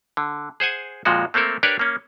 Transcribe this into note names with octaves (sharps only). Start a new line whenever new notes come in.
D3
G#4 C5 F#5 G#5
F2 A#2 F3 G#3 F#4
A3 A#3 C4 A4 A#4
D4 G4 A#4 B4 C#5 D5
A#3 C#4